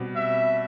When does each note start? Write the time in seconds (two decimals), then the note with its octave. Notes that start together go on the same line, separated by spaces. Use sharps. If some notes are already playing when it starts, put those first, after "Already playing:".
Already playing: B2 G3 C4 G4
0.16 E5